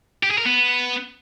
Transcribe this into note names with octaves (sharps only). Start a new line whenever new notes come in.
G4
G#4
A#4
B3